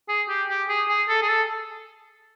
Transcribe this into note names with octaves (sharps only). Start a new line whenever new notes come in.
G#4
G4
G4
G#4
G#4
A4
G#4
A4